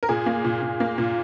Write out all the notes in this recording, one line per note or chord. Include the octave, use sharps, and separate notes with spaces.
A#4
A#2 G#4
A#3
A#2
A#2
A#3
A#2